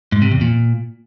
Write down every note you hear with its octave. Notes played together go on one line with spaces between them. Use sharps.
G#2
C3
E2
A#2